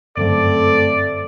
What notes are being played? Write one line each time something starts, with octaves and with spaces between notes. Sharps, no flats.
G1 F#2 A3 C4 A4 D5